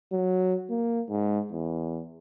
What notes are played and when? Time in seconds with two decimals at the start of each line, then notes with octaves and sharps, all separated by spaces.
0.12 F#3
0.70 A#3
1.09 G#2
1.51 E2